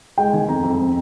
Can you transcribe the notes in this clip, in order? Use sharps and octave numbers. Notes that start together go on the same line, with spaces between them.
G#3 G5
D#3 G#5
F2 A#5
F2
C4